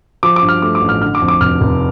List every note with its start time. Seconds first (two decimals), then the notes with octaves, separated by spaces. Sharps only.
0.23 F3 D6
0.36 D6
0.42 G2
0.49 F6
0.62 A3 D6
0.75 D6
0.82 A1
0.89 F6
1.02 D3 F6
1.15 D6
1.22 F2
1.28 D6
1.41 F1 F6
1.61 F1